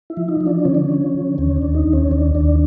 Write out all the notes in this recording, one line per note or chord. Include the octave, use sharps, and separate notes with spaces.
E4
F3
D#4
F3
D4
D3 C#4
D4
F3 C#4
D3
D#2 C#4
D4
D#2
D#4
D#2
C#4
D#2 D4
D#2 D4